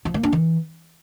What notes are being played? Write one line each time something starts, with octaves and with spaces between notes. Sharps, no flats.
F3
A#3
D4
E3